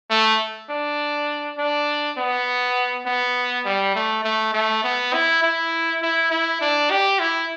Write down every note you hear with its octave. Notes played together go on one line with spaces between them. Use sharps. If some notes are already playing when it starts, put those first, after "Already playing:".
A3
D4
D4
B3
B3
G3
A3
A3
A3
B3
E4
E4
E4
E4
D4
G4
E4